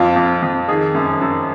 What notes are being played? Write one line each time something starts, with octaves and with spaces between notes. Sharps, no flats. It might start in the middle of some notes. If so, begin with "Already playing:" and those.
Already playing: F2 F4
F2
F2
D#3 G#4
F#2
F#2